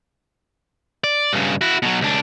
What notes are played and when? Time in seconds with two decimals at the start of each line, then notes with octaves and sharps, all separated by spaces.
1.04 D5
1.33 G2 C#3
1.61 E4 F#4
1.82 B2 F#3
2.01 C#2 D4